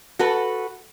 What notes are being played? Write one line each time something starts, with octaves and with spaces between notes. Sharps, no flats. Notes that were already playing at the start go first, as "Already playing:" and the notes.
F#4 A4 B4